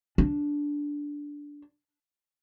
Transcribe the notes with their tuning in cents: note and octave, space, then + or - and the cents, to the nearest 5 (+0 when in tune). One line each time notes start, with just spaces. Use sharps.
D4 -10